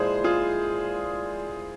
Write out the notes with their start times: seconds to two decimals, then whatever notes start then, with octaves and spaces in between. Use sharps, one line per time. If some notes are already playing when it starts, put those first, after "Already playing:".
Already playing: A#2 F3 G#3 E4 G#4 C5
0.24 F4 G#4